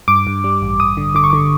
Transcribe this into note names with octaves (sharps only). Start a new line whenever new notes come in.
G2 D6
G2
G3
A1
A1 D#6
D3
D3 D6
C#6
D3 D6